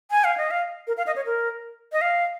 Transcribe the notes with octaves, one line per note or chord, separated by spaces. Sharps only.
G#5
F5
D#5
F5
A#4
F5
D#5
C#5
A#4
D#5
F5